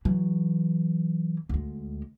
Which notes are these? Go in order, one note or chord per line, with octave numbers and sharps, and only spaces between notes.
E3 F#3
D2 G#3